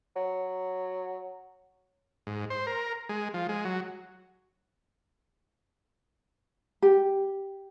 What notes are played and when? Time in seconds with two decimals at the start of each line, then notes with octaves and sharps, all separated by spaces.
0.16 F#3
2.27 G#2
2.50 C5
2.67 A#4
3.09 G#3
3.34 F3
3.49 G#3
3.65 F#3
6.82 G4